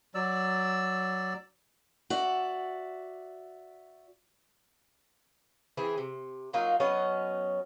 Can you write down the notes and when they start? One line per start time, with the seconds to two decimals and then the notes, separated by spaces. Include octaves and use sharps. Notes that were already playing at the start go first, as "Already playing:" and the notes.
0.15 F#3 D5 E6
2.10 F#4 D5 E5
5.77 E3 C4 G#4 E5
5.98 C3
6.53 F#3 A#3 D#4 F4
6.80 F#3 B3 C#4 D#5